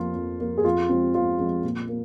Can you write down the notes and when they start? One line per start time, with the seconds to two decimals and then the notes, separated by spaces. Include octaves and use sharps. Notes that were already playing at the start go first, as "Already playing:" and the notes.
Already playing: F2 F3 A#3 F4
0.15 F2
0.40 F3 A#3
0.58 G#4
0.64 F2 F4
0.89 F3 G#3 C4
1.14 F2 F4
1.39 F3 G#3 C4
1.64 A#2
1.88 A#3